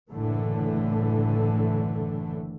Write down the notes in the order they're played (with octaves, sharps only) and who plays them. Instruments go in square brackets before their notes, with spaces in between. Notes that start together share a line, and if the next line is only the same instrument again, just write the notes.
[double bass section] F#1 A2 D3 E3 A3